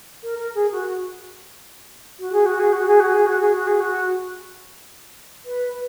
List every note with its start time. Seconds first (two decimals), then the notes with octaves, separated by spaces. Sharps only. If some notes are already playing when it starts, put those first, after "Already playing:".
0.23 A#4
0.39 A#4
0.55 G#4
0.72 F#4
2.19 F#4
2.33 G#4
2.46 F#4
2.60 G#4
2.73 F#4
2.87 G#4
3.00 F#4
3.13 G#4
3.26 F#4
3.40 G#4
3.54 F#4
3.67 G#4
3.81 F#4
5.46 B4